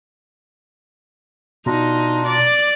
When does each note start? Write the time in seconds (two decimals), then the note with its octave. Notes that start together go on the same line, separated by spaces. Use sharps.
1.66 B2 D4 D#4 F4 A#5
2.26 D5